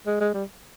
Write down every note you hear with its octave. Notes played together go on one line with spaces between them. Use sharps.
G#3
G#3
G3